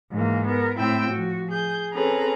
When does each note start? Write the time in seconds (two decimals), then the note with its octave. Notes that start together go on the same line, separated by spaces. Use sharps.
0.12 G#2 E3 A#3
0.48 B3 A#4
0.78 A2 C4 E4 G5 E6
1.09 F3 F#4
1.51 G#4 G6
1.93 C4 C#4 G#4 A4 B4 A#5